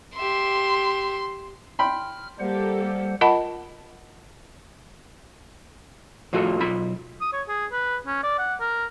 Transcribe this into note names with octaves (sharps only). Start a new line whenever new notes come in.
G4 E5 C6
G5 B5 C6 F6
G3 A#3 G4 A4 C5 F#5
F4 A#4 D#5 F#5 A5 B5
A2 F3 F4 F#4 A4
B1 F4 B5
D#6
C#5
G#4
B4
C#4
D5
F#5
A#4